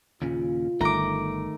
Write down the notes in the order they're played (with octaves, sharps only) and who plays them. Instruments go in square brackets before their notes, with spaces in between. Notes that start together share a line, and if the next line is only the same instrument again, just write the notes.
[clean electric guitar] D#2 A#2 C#3 [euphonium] F4
[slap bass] G1 [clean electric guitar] D#3 A3 [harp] A#5 D6